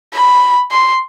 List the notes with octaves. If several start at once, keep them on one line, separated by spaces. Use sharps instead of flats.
B5
C6